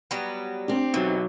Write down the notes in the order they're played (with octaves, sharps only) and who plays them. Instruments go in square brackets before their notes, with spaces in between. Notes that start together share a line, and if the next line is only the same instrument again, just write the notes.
[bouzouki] F#3 G3 B3
[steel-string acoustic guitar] C4 G4 [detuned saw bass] D4
[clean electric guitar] B2 F#3 [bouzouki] E3 [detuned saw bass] D#4